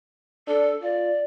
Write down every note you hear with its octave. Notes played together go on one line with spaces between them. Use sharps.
D4 A4
F4 D5